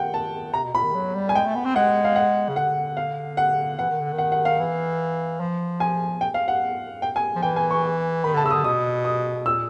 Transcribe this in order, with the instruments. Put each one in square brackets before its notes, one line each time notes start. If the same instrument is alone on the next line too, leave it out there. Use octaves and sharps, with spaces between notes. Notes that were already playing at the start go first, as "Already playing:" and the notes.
Already playing: [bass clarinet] D#3 [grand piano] F#5 G5
[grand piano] A5
[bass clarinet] C3 [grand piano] A#5
[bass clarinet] B2
[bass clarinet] A#2 [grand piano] B5
[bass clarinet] D#3
F#3
G3
[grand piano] G#5
[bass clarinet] G#3 [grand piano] G5
[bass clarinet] A3
B3
C4
[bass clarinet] G#3 [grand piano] F#5
[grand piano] F5
F#5
[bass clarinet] C#3
[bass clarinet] D3 [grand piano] F#5
[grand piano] F5
F#5
[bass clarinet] E3 [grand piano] F#5
[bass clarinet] D#3
D3
D#3
[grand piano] F#5
F#5
F5
[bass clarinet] E3
F3
[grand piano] G#5
G5
F5
F#5
G5
G#5
[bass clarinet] F3
[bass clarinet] E3 [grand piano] G5
[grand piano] G#5
C#6
[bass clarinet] D#3 [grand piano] B5
[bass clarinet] D3 [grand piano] A5
[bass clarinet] C#3 [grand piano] E6
[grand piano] D#6
[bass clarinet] D3
[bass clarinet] B2 [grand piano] D#6
[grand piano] D#6
[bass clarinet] A#2 [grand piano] E6